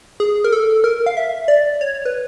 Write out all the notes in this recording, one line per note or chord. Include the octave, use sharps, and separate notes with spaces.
G#4
A#4
A4
A#4
F5
E5
D5
C#5
B4